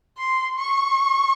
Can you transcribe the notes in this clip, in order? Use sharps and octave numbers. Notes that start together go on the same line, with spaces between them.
C6
C#6